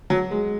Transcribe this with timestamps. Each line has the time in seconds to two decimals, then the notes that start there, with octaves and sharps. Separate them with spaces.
0.10 F#3
0.31 G#3